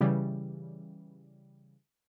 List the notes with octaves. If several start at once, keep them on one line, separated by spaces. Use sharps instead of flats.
C#3 E3 G3